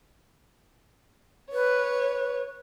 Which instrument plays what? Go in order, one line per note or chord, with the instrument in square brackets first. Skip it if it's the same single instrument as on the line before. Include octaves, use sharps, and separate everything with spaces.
[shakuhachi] B4 [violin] C#5